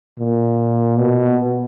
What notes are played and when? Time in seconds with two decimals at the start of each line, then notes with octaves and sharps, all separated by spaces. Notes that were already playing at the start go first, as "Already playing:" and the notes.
0.19 A#2
0.98 B2